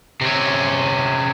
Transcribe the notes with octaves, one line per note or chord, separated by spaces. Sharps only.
C3 C#4